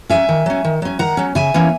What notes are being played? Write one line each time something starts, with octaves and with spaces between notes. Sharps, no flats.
F#3 C#4 E5 G#5
D#3
F#3 C#4
D#3
F#3 C#4
D#3 F#5 A#5
F#3 C#4
C#3 E5 G#5
E3 A#3 C#4